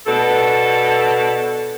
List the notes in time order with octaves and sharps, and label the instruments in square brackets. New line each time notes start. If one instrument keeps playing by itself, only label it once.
[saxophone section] B2 D4 A4